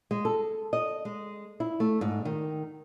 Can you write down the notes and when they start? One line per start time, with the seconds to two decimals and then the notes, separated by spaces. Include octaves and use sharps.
0.11 G#3
0.25 A4
0.73 D#5
1.05 G#3
1.60 E4
1.80 A3
2.01 G#2
2.25 D#3